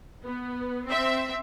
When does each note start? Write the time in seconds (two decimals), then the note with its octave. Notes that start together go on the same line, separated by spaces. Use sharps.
0.25 B3
0.87 C4 E5